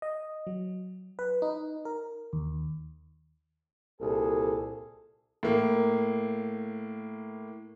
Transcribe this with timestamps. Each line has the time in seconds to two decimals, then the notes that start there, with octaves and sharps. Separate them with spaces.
0.02 D#5
0.47 F#3
1.19 B4
1.42 D#4
1.85 A#4
2.33 D#2
4.01 C2 A#2 G#4 A4
5.43 A2 A#3